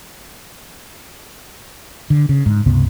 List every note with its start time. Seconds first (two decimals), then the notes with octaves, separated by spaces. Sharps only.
2.10 D3
2.29 C#3
2.46 G#2
2.66 C#2 G2 C3 B3